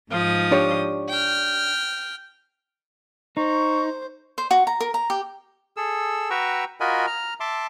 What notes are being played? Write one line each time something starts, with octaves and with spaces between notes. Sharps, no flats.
G#2 F3 D#6
D4 G4 C#5
G5 F6
D#4 C5 C#6
C5
F#4
A#5
A#4
A#5
G4
G#4 A4 E6
F#4 B4 G5 A#5 C#6 E6
F4 F#4 A#4 D#5 G#5 B5
A#5 F6
E5 A5 C6 D6